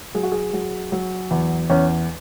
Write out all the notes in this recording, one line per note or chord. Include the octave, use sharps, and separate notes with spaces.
F#3 G#4
F#4
G#4
F#3
F#3
E2
E2 C#4